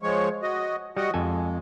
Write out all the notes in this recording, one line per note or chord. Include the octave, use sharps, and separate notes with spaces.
F3 G#3 C#5
F#4 D#5
G3 F#4 D#5 F#5
F2 G#3 A4 G#5